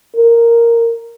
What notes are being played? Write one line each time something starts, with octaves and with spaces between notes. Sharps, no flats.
A#4